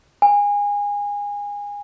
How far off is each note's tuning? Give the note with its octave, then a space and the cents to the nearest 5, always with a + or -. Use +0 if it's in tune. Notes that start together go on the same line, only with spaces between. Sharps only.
G#5 -25